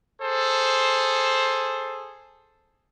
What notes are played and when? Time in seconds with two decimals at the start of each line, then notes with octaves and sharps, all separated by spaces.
0.22 G#4 A4 C5